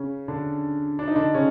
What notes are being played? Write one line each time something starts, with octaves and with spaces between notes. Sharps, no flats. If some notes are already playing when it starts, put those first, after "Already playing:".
Already playing: C#3 C#4
D3 D4
D4
D#4
D3 D4
C#3 C#4